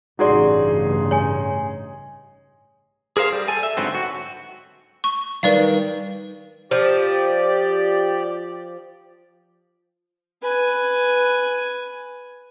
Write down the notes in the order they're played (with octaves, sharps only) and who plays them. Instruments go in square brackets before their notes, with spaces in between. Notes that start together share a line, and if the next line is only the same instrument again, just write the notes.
[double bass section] A1 G2 C#3 [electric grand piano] D#4 G#4 C6 [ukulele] F#4 D5
[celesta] C#5 G#5
[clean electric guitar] G#4 A#4 C5 F5
G3
A4 G#5
E5
G#2 D3 F#3 B3 C4
F#4
[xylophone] C#6
[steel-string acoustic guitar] D#3 G3 [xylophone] B4 D5 F5
[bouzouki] F3 [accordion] G4 D5
[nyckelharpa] B4 G#5